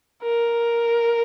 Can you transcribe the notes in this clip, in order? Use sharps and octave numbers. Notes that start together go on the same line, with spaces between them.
A#4